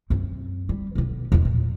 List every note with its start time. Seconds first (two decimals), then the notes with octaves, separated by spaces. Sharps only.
0.10 F#2 C4
0.69 G3
0.95 B1 B3
1.32 E2 G#3
1.45 A#2